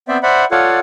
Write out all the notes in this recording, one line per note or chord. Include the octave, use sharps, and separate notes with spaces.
B3 C4 C5 D5 E5 G5
C5 D5 E5 F#5 B5
F4 A4 C#5 D5 F5 F#5